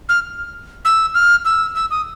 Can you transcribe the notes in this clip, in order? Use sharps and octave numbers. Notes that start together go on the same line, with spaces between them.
F6
E6
F6
E6
E6
D#6